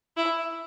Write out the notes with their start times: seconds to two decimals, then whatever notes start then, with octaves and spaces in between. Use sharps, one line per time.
0.17 E4